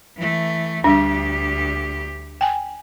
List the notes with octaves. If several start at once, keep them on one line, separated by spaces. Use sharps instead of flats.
E3 A3
D2 G3 D4 G4
G5 G#5